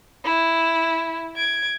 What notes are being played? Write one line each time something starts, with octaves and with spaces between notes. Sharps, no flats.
E4
G#6 D7